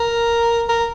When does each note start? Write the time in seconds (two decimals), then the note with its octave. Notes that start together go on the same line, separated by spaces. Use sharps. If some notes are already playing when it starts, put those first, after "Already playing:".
Already playing: A#4
0.69 A#4